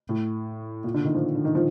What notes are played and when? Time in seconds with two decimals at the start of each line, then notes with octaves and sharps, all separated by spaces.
0.09 A2
0.84 A#2
0.94 D3
1.05 D#3
1.14 F3
1.35 D3
1.45 D#3
1.55 F3